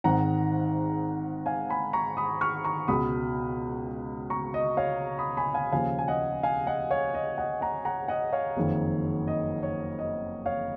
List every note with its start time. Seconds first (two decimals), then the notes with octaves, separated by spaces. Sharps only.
0.04 G#1 G#2 D#3 F#5 A#5
1.46 F5 G#5
1.70 G#5 B5
1.93 A#5 C#6
2.17 B5 D#6
2.41 C#6 F6
2.65 A#5 C#6
2.88 C#2 B2 B5 D#6
4.30 A#5 C#6
4.54 D#5
4.77 C#5 F5
5.19 B5 D#6
5.37 G#5 B5
5.54 F5 G#5
5.72 D#2 C#3 F3 F5 G#5
5.99 G#5
6.08 D#5 F#5
6.43 F5 G#5
6.66 D#5 F#5
6.90 C#5 F5
7.14 D#5
7.38 D#5 F#5
7.61 F#5 A#5
7.85 F#5 A#5
8.08 D#5 F#5
8.33 C#5 F5
8.57 F#1 F2 D#3
9.28 D#5
9.63 C#5
9.99 D#5
10.46 C#5 F5